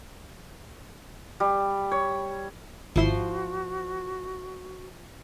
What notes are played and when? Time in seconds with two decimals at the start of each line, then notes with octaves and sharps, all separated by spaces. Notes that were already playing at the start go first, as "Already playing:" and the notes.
1.40 G3
1.92 C#5
2.96 G#1 F3 E4 F#4 C5 C6